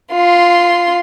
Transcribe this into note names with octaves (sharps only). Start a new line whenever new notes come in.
F4 C6